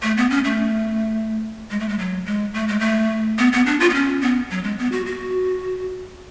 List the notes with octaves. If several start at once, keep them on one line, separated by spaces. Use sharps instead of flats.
A3
B3
C#4
A3
G#3
A3
G#3
F#3
G#3
A3
G#3
A3
B3
B3
D4
F4
B3
C#4
B3
F#3
G#3
B3
F#4
F#4